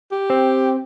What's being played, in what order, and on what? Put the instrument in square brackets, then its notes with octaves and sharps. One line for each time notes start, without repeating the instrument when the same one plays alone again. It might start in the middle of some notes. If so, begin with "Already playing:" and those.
[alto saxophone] G4
[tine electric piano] C4